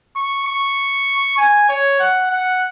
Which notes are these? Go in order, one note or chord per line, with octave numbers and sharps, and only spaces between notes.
C#6
C#6
G#5
C#5
F#5
F#5